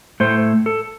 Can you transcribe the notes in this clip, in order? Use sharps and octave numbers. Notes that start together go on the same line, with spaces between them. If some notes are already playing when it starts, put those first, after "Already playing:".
A2 A3 C5
A4